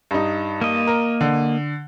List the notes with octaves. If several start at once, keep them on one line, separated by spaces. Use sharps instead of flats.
G2 D#4
A#3 D#5
A#4
D3